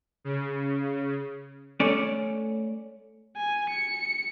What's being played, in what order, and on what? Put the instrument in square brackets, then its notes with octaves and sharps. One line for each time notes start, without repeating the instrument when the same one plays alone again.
[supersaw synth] C#3
[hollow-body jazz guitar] A3 C#4 D5
[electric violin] G#5
C#7